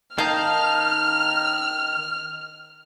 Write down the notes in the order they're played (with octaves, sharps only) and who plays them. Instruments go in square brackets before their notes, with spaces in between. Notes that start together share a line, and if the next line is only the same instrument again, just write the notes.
[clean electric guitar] D#3 D#4 [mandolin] F5 A5 G6 [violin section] F6